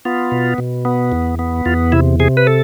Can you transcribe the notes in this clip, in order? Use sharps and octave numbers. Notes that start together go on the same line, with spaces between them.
B3 F4
B2
B2
B3
E2
B3
E2 F4
C3 E4
C3 G#4
B4
A4